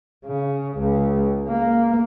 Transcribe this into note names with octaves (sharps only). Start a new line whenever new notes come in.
C#3
C#2
A#3